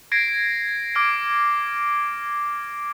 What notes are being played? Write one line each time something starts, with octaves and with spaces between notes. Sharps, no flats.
G#6 A#6 C7 D7
D6 F6 D7